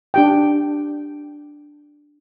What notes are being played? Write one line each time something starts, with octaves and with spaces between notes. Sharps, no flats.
D4 G4 G5